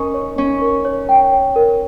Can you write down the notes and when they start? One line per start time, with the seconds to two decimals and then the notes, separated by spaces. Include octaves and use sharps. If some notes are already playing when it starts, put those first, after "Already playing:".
Already playing: C#4 D#4 A#4 C#6
0.14 C#5
0.38 C#4 C#5
0.61 A#4
0.85 C#5
1.09 G5
1.32 C#5
1.56 A#4